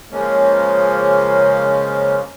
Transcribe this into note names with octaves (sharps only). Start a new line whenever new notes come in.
C#3 F3 G#3 A#3 C#4